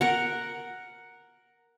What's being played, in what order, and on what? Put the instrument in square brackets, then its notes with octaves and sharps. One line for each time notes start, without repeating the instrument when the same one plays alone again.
[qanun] A#4 F#5